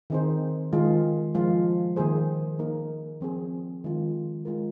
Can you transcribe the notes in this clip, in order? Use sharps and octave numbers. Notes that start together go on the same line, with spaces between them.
D#3 C4 D#4 G#4 C5
D#3 G#3 F4
F3 G#3 F4
D#3 A#3 G#4 C5
A#3 D#4 A#4
F3 C4 G#4 C5
D#3 G#3 F4
G#3 F4 A#4